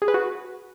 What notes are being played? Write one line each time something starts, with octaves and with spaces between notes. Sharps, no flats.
G#4
B4
F#4